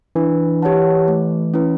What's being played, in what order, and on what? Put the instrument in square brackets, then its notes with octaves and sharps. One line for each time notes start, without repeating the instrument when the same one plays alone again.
[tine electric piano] E3 [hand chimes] D4
[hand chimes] G4 C#5 F#5 A5
A3
C#4 E4 B4